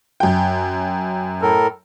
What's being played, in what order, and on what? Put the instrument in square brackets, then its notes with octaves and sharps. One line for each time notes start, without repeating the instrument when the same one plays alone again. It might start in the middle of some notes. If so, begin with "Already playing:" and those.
[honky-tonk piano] F#2 G5
[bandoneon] A2 A4 A#4